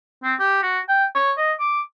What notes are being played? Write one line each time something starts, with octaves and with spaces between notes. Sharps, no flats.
C4
G4
F#4
G5
C#5
D#5
D6